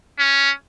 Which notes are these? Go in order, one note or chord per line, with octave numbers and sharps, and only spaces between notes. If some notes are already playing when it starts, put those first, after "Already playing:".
C#4